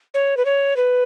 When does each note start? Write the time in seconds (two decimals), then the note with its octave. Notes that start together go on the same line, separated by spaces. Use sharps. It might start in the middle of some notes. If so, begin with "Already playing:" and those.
0.14 C#5
0.37 B4
0.45 C#5
0.76 B4